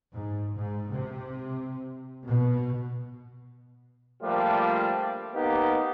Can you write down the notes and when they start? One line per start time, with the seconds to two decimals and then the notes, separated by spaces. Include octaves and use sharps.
0.13 G#2
0.55 G#2
0.92 C3
2.28 B2
4.23 F3 G3 A3 A#3 D4 F4
5.35 A#3 B3 D#4 G4